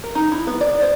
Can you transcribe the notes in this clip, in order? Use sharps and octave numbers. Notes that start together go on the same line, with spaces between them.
A#4
D#4
E4
B3
D5
C5